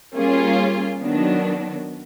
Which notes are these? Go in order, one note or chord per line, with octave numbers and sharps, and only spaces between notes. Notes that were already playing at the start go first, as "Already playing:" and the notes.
G3 A#3 C#4 F4 G#4
D#3 F#3 B3 D4